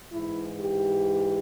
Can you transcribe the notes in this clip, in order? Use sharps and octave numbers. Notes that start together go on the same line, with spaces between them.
G#2 E3 E4
G4